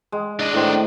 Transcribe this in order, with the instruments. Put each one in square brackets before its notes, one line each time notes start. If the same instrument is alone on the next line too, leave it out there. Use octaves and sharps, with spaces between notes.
[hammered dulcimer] G#3
[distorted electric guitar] D4 D#5
[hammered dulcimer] A2 D#3 C5